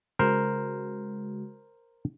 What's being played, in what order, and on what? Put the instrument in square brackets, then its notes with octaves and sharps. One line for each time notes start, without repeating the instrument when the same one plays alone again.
[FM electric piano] C#3 G#3 F#4 [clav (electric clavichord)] A#4 C5